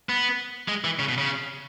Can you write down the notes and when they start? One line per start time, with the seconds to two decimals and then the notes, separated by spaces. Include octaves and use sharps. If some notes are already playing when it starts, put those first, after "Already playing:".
0.09 B3
0.68 G#3
0.84 E3
0.99 C#3
1.08 B2
1.18 C#3